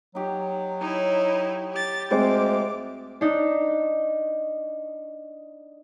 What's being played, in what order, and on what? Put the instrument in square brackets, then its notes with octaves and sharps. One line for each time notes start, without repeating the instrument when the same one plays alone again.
[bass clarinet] F#3 [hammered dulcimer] D#4 G4
[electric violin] D#4 E4 [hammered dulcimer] C#5
[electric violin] G4 A6
[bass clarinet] D2 [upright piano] G#3 C4 C5 [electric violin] D6
[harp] D4 D#4